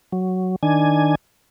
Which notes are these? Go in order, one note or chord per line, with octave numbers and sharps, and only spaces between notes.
F#3
D#3 D4 G#5